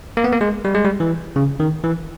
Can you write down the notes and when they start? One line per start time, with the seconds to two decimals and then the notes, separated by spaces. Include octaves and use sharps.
0.17 A#3
0.24 B3
0.32 A#3
0.41 G#3
0.65 G3
0.75 G#3
0.85 G3
1.00 E3
1.36 C#3
1.60 D#3
1.84 E3